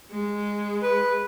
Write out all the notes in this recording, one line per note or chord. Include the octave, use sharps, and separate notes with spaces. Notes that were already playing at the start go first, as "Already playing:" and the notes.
G#3
B4